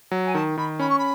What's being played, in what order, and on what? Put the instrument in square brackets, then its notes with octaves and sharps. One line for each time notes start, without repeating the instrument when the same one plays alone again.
[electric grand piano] F#3
[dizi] G#5
[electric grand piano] D#3 [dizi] A5
[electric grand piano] D#3 [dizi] B5
[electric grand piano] C#4 [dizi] B5
[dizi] C#6
B5